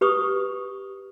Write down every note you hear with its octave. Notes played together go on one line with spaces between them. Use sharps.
G4 B4 C#6 D#6